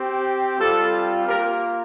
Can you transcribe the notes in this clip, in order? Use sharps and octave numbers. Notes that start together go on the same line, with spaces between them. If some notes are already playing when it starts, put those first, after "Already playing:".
Already playing: C4 G4
G3 C4 F4 A4
A#3 F4 G4 A#4